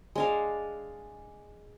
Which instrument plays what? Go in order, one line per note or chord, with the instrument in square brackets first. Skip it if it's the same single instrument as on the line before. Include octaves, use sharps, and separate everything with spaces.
[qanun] G#3 D4 F5